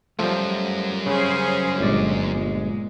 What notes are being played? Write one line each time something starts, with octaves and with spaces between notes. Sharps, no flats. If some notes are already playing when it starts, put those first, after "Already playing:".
C#2 F#2 F3 G3 A3
C#3 C#4 G#4 C5
G1 A#2 G#3 D5